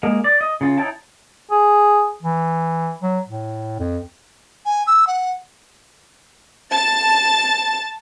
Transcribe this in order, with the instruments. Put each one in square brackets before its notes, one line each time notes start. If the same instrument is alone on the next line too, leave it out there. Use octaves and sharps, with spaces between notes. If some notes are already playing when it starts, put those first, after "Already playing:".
[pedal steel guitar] G#3 A#3
D5
D#5
C#3 F4
D#4 E4 C#5 G5 A5
[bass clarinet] G#4
E3
F#3
A2
F2
[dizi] G#5
E6
F#5
[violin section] A5 A6